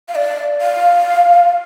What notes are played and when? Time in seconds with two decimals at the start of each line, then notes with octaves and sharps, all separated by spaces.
0.08 F5
0.15 D5
0.61 F5